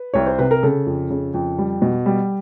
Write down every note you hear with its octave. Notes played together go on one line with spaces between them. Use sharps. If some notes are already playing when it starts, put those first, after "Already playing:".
Already playing: B4
C2 C#5
C5
C3 B4
A#4
C#3 A4
F2
C#3
F2
G3
B2
G3